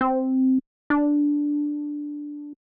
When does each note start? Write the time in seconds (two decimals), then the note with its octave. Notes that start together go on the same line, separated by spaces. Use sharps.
0.01 C4
0.90 D4